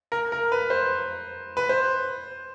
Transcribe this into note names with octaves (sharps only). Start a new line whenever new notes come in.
A#4
A#4
B4
C5
B4
C5